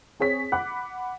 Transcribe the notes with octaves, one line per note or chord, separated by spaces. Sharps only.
C4 G#4 C#5 B6
F#5 B5 D6 F#6